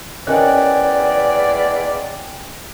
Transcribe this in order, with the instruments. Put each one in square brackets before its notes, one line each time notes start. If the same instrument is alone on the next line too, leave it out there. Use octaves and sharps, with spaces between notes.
[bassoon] E2 [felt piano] C#4 A#4 D#5 [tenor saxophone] D5 [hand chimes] G5 G#5 F#6